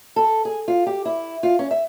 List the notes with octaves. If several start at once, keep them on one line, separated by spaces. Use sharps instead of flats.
A4
G#4
F4
G4
E4
F4
C#4
E5